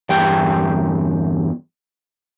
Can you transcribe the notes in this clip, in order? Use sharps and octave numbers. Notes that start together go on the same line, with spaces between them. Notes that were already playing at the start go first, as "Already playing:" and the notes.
E2 G2 G5